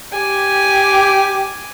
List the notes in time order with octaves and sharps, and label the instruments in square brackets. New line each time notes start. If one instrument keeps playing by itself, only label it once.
[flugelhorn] G4 [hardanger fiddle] G#5 D6